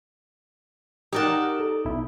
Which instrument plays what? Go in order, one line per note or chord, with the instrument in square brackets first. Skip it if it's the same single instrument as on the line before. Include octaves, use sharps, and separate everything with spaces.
[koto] D#4 D5 A5 [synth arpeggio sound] G4 A#4 F#5
[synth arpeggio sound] A4
B1 E4